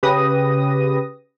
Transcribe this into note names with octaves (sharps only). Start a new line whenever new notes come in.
C#3 G4 B4 D#6 A#6